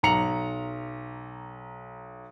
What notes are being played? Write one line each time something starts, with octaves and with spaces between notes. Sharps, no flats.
B1 A#5 C#7 F7 F#7